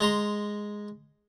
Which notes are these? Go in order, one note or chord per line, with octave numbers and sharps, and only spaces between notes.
G#3 A#5 C6